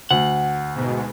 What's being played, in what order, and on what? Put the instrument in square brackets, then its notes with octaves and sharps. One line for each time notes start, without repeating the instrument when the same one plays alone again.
[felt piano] D2 [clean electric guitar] F#5
[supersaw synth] G#2 B2